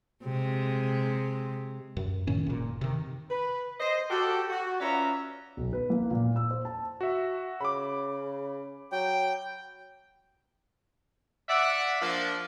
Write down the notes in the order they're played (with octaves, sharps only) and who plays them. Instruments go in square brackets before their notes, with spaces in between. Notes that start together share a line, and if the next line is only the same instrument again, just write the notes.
[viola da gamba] C3 G#3
[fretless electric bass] F#2
A2 D#3 C#4
F#1 A#2
C3 D#3
[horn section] B4
C5 D#5
F#4 G4 A4
F#4
C#4 F4 B4 D5 E5 A#5
[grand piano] B1
B4
A#3
A#2
E6
C5
A5
[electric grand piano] F#4 E5
[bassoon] C#3 [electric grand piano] B5 D6
[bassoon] F#3 [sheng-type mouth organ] G5
[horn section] D5 E5 F#5
F3 A#3 D4